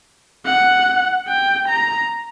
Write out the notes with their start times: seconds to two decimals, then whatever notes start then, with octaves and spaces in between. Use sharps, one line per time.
0.45 F#5
1.28 G5
1.68 A#5